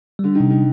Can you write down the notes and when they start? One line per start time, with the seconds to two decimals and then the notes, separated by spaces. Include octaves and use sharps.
0.19 D3 G3
0.35 D#3
0.40 C3
0.50 D#3